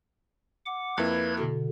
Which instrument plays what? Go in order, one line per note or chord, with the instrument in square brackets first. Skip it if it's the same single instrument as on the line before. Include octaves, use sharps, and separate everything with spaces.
[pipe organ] F#5 D6
[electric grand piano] F2 A#3 E4 [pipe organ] B4 G#6
[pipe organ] B2 D3